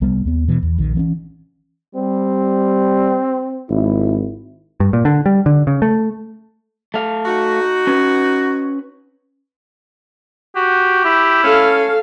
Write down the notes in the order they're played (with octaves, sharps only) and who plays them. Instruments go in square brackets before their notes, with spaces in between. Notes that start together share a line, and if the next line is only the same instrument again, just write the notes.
[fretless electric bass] C2 G3 B3
D#2 B3
B2 E3
E2
A#1 D#3
E3 C4 C#4
[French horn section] G3 [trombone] C4
[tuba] G#1 [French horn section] E4
[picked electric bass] G2
A#2
D3
G3
D3
C#3
A3
[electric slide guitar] A3 F5
[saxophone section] D#4 F#4
[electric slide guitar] C#4 B4
[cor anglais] F#4 [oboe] G4
[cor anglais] E4
[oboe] C#4 [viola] A4 F5